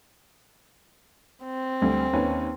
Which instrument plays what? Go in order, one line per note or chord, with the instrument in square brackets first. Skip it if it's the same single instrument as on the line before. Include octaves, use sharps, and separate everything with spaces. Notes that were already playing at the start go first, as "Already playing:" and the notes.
[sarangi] C4
[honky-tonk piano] D2 G3
D#2 C#4 B4